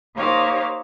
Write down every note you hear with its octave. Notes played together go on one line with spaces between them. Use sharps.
A#3 D#4 G4 C5 C#5 F5